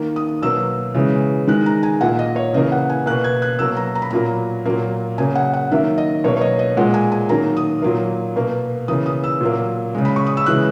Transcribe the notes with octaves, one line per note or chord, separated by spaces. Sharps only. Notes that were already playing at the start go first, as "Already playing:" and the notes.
Already playing: D#3 A#3
D#6
B2 F#3 A#3 E6
C#3 E3 G#3
D#3 G#3 F#6
A#5
G#5
A#2 A#3 F#5
D#5
C#5
C#3 E3 A#3 D#5
F#5
G#5
B2 A#3 F#6
G#6
F#6
B2 F#3 A#3 E6
A#5
A#5
B5
A#2 F#3 A#3 A#5
A#2 F#3 A#3
C#3 F#3 A#3 G#5
F#5
F#5
D#3 F#3 A#3 E5
D#5
B2 F#3 A#3 C#5
C#5
D#5
D#5
A#2 G#3 F#5
G#5
G#5
D#3 F#3 A#3 A#5
D#6
A#2 F#3 A#3
B2 A#3
C#3 E3 A#3 D#6
D#6
E6
A#2 F#3 A#3
C#3 G#3
B5
C#6
D#6
E6
C#3 E3 G#3 F#6